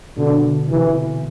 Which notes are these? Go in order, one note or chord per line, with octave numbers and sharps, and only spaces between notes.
B2 D3
D3
C3 E3